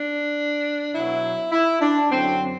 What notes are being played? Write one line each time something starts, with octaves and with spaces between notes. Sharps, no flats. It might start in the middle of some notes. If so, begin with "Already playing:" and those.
Already playing: D4
B2 F#3 E4
E4
D4
F#2 D3 F#3 C4